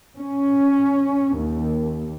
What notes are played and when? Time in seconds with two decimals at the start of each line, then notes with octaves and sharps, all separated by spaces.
0.17 C#4
1.38 D#2